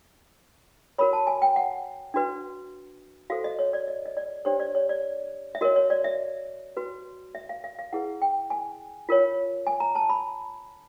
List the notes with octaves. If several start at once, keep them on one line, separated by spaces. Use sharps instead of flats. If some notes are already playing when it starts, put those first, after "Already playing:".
F#4 A#4 C#5 B5
A5
G#5
G5
F#5
D4 F#4 B4
F#4 A4 C5 F5
D#5
C#5
D5
D#5
D#5
D5
D4 G4 C5 C#5
D5
C#5
D5
E5
F#4 A#4 C#5 D#5
C#5
D5
E5
F#4 B4
E5
F5
F5
F5
E4 G#4 B4 F#5
G5
G#5
F4 A#4 C#5
G#5
A#5
A5
B5